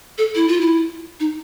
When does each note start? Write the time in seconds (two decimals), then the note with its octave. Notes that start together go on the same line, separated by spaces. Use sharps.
0.18 A4
0.35 E4
0.48 F4
0.61 E4
1.20 D#4